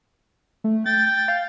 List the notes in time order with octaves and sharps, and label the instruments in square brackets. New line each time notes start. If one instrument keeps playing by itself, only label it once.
[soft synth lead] A3
[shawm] G5 [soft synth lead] A6
[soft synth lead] F5